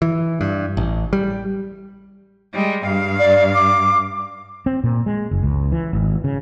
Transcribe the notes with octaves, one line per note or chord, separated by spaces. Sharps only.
E3
G2
A1
G3
G3 G#3
G2 F5
D5
D6
C4
A#2
G#3
F#1
C#2
E3
G#1
C#3